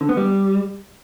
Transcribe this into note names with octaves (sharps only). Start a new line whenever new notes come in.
D3
B3
G3